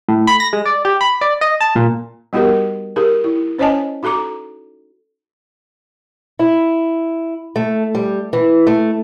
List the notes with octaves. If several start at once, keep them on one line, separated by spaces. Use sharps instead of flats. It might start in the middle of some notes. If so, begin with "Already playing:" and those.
A2
B5
A#6
G#3
D5
G4
B5
D5
D#5
A5
A#2
G3 B3 D#4 F#4 G4 A#4
D#4 G4 G#4 A#4
E4
C#4 C5 C#5 D#5 G#5 A5
D#4 F#4 A4 A#5 D6
E4
A3
G3
E3
A3